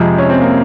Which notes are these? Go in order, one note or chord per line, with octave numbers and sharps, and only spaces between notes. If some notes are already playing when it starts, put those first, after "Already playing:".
Already playing: F2 C3 F3 G#3 C4
C#4
C4
A#3